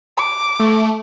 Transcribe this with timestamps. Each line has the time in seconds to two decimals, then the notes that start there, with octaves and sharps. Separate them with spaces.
0.18 D6
0.60 A3